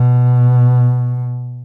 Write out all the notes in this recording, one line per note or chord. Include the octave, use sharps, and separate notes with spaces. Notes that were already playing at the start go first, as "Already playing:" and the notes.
Already playing: B2